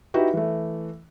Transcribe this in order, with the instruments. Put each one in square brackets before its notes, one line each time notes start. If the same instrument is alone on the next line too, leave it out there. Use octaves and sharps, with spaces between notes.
[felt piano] D#4 E4 F#4 G4 B4
E3 A3